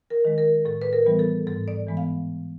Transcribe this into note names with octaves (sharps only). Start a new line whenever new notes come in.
A#4
D#3 G#3
A#4
A2 A4
B4
A#4
E3 G3 B3
A4
G#2 A4
D5
E3 G#3 B3
F5